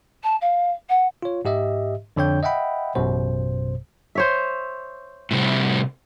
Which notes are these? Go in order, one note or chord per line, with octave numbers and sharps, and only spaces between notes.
A5
F5
F#5
F4 C#5
G#2 G4 D#5 E5
F2 D3 D4 C#5 G5 G6
D#5 E5 F#5 G5 B5
A1 F#2 B2 C5
C5 C#5 E5
A2 C3 G3